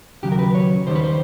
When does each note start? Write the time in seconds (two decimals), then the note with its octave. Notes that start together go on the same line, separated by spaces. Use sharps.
0.23 D#2 C#3 F#3 G4
0.32 A#4
0.39 B4
0.55 C#5
0.86 D#2 D#3 G3 C5
0.95 B4
1.04 C5